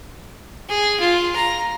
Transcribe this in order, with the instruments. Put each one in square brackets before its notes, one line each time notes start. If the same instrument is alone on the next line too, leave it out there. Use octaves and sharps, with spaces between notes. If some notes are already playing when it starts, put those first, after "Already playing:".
[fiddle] G#4
F4
A#5